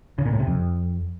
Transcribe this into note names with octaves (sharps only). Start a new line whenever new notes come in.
C#3
A#2
A2
C3
F2